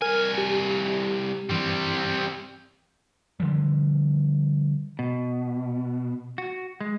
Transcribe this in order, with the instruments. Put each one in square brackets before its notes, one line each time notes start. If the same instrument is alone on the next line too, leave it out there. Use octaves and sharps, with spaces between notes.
[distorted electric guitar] C2 G#5 [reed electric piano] A#4 F6
[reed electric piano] G4
[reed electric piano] G2 E3 [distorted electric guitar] G3 C4
[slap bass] D3 E3 F3 G3
[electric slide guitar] B2
F#4
G#3